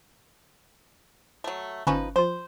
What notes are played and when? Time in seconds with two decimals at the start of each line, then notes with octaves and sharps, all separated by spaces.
1.44 F#3 A3
1.87 G1 F3 C#4 D#4 B4 C#6
2.16 F3 F4 C5